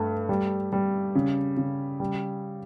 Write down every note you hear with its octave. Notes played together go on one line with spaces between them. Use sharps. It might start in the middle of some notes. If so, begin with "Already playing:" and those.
Already playing: G2 A3
G3
G3
C#3
C#3
G3